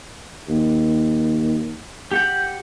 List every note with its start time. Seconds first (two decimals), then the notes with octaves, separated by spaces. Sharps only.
0.49 D#2
2.11 G4 F#5 G6